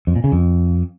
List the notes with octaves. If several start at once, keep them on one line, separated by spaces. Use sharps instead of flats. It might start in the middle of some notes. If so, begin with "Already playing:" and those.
F2
A#2
C#3
F2